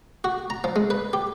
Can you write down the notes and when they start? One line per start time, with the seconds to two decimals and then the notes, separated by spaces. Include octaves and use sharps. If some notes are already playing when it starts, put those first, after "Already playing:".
0.24 F#4
0.50 A#5
0.64 F3
0.76 G#3
0.90 B4
1.13 G4